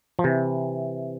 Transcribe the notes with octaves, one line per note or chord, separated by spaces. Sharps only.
F3
C3 E3